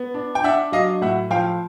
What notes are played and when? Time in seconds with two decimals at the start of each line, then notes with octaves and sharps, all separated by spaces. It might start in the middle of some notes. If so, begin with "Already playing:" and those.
Already playing: B3
0.14 D4
0.35 G5
0.44 D4 E5 F#5
0.72 F#3 D#5 F5
1.01 A2 E5 F#5
1.31 F3 F5 G5